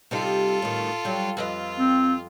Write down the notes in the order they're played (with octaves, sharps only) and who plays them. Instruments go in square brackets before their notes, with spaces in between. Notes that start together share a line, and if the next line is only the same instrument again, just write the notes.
[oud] C3 G3 D#4 [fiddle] F4 A4
[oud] A2 D#3
F#3 G3
[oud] F2 B4 D#5 [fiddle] F4
[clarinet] C4